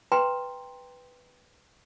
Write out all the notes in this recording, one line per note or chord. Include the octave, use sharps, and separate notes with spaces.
B4 G5 A#5 C6